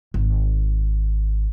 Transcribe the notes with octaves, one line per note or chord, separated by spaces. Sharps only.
G#1